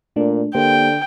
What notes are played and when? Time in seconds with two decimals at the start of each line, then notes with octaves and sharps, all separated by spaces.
0.16 A#2 A3 D4
0.55 D3 A#3 G4 C5 G5